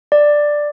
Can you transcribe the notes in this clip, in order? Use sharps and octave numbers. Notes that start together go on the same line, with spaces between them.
D5